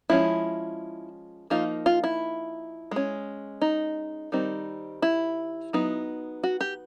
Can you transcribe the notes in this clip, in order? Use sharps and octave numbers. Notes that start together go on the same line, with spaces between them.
F3 G#3 C#4 E4
F3 A#3 D#4 F4
F4
E4
G#3 C#4
D#4
D#3 G3 C4 D#4
E4
F#3 B3 D#4
F#4
G4